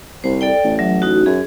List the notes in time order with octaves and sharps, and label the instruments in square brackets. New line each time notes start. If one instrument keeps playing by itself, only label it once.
[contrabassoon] C2 [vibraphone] C5
[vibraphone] A4 D5 G5
[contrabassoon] A1
[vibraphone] F#3 E5
D#4 F#4
[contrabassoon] F#2 [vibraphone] G#4